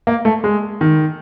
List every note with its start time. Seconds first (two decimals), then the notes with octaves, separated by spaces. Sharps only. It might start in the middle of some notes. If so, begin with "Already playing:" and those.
0.07 A#3
0.25 A3
0.44 G#3
0.81 D#3